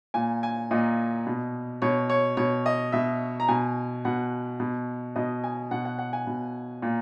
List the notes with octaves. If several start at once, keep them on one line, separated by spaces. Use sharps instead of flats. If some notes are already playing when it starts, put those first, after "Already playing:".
A#2 G#5
G#5
A#2 D#5
B2
B2 C#5
C#5
B2 C#5
D#5
B2 E5
A#5
B2 G#5
B2 F#5
B2
B2 D#5
G#5
B2 F#5
F#5
F#5
G#5
B2
A#2